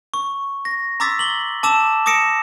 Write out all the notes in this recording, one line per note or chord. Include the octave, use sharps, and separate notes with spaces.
C#6
A#6
A#5 C6 D6 E6 A6 B6
F#7 G7
A5 D6 E6 E7
D6 D#6 A#6 C#7 D7 E7